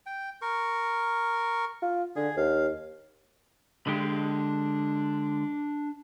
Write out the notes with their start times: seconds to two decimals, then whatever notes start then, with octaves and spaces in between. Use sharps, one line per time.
0.06 G5
0.42 A#4 C#6
1.82 F4
2.16 D3 G#4
2.37 D#2 F5
3.87 D3 G#3 D4 G4 B5